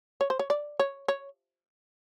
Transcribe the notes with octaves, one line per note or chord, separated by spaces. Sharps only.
C#5
C5
C#5
D5
C#5
C#5